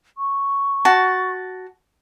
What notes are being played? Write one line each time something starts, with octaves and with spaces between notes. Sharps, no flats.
C#6
F#4 A5